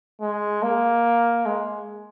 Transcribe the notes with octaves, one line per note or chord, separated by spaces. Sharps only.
G#3
A#3
G#3